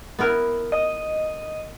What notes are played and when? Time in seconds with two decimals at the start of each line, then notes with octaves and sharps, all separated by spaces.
0.19 B3 E4 A#4
0.72 D#5